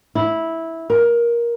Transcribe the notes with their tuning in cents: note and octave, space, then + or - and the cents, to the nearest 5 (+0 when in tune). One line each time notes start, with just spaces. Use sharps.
E4 -10
A#4 +15